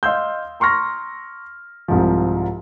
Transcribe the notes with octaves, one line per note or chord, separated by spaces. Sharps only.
D#5 F5 C6 E6 G6
A#5 C6 C#6 F6 A#6
C2 G#2 F3